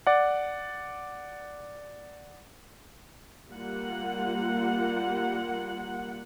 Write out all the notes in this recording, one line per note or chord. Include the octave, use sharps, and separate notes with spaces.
D5 F#5
G3 A#3 F4 F#5